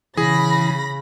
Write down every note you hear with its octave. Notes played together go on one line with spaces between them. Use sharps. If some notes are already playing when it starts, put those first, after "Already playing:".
C#3 E3 G#4 B5 A#6